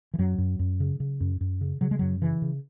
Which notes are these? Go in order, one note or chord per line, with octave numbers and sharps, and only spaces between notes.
E3
F#2 F#3
F#2
F#2
C#3
C#3
F#2
F#2
C#3
C#3 F#3
G#3
F#2 F#3
C#3 E3
C#3